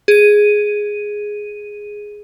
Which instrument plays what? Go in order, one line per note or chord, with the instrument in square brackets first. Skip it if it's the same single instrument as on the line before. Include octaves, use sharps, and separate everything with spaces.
[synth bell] G#4 D#7